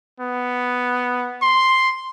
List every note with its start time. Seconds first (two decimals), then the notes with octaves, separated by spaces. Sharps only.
0.20 B3
1.42 C6